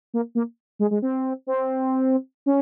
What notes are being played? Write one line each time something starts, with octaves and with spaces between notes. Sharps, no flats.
A#3
A#3
G#3
G#3
C4
C4
C#4